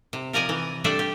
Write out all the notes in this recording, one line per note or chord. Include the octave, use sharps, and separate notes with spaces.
C3
F3 A#4 D5 D#5 G#5
E3
G3 A3 D4 E5
G4